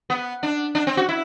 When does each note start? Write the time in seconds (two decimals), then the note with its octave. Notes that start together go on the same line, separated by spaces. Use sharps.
0.10 B3
0.43 D4
0.75 D4
0.87 C4
0.97 F#4
1.09 E4